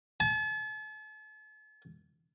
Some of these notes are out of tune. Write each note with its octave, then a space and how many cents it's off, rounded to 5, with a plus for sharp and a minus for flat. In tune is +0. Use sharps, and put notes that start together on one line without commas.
A5 -40